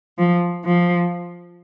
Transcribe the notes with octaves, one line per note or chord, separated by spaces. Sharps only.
F3
F3